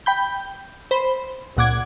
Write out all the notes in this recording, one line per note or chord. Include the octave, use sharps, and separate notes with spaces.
G5 B5 G6
C5 B5
C#2 A#2 F#5 D6 G#6